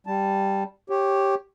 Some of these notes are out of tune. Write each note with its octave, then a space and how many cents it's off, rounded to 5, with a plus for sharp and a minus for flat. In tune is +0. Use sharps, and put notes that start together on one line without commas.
G3 +0 A5 +0
G4 +0 C#5 -15